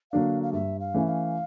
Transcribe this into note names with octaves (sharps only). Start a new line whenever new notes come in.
D3 F#3 A#3 D4 F5
F5
G2 E5
F5
E3 A3 C#4 E4
F5